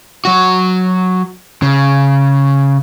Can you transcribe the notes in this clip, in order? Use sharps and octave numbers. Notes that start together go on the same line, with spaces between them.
F#3 F#4
C#3